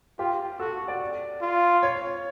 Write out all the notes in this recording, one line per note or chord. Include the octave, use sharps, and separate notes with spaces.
F4 G4
F#4 A4
D5
F4
C#5